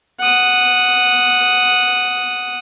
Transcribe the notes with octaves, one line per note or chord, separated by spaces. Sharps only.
F#5 D#6